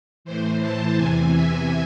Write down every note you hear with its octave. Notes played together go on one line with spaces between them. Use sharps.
A2 E3 C5
A5
E2 C3 E3 G#5
E5